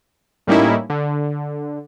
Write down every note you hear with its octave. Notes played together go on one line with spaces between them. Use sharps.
A2 G3 A#3 C#4 D#4 E4
D3